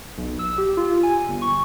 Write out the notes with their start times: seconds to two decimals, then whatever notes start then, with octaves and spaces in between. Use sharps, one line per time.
0.18 B1
0.39 E6
0.58 G4
0.77 F4
0.89 F4
1.03 G#5
1.29 G1
1.42 C#6